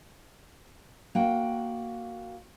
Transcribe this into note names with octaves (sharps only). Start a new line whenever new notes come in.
A#3 F#4 G5